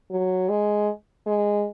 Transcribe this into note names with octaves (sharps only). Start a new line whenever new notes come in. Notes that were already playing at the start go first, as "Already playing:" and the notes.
F#3
G#3
G#3